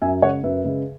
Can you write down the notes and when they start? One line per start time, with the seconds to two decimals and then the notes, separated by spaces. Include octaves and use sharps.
0.02 F#2 E5 G#5
0.22 C#3 G#3 C#5 F#5
0.43 F#2 B4 E5
0.65 C#3 G#3